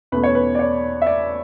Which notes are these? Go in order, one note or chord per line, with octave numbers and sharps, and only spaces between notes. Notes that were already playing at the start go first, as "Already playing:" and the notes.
E2 B2 A3 C#4 B4
C#5
B4
D5
C#5
E5
D5